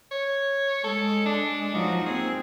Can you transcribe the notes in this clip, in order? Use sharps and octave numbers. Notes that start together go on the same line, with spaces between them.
C#5
G#3 A4
D4
F3 F#3 D#4 F#4
A#3 C4 G#4